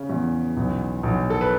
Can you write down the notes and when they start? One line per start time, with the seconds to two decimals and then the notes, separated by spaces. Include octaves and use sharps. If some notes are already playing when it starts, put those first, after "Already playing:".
Already playing: C#3
0.10 E2
0.57 B1
1.03 B1
1.30 A4
1.41 B4